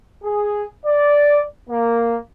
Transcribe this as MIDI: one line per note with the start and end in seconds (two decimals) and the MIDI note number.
0.24 0.64 68
0.85 1.42 74
1.70 2.17 58